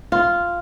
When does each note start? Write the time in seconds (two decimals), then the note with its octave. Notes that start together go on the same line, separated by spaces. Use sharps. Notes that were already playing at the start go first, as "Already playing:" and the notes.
0.12 F4